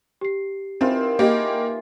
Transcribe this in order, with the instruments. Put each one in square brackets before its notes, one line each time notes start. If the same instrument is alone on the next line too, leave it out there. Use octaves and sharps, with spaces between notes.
[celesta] G4 C7
[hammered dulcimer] D#3 E3 F4 [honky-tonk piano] C4
[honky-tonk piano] A#3 G4 [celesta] G#4 A#4 D#5